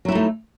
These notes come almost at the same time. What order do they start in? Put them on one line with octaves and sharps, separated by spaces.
F#3 E4 D#4 A3